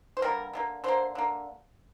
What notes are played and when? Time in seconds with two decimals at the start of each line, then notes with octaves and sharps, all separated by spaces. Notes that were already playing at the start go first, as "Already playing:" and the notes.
0.17 C5
0.22 D3 G3 A#3 A#4
0.53 D3 G3 A#3
0.84 D3 A#3 C5
1.15 D3 A#3